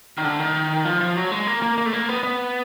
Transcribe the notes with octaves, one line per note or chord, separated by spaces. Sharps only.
D#3
D3
D#3
F3
F3
F#3
G#3
A#3
A#3
A#3
A3
A#3
B3
B3